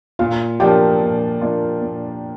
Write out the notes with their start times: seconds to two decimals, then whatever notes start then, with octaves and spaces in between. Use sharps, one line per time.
0.19 A#2 F4 F5
0.60 F3 A#3 D4 F4 G4 G5
1.01 A#2
1.41 F3 A#3 D4 F4
1.81 A#2